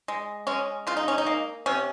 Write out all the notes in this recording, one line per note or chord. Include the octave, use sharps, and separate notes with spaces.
G#3
G#3 C#4
C#3 F4
D#4
C#4
D#4
A#3
C3 C#4